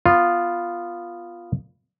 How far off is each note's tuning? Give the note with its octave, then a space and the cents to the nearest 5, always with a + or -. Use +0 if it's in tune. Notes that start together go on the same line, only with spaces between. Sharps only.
B3 -5 F4 +0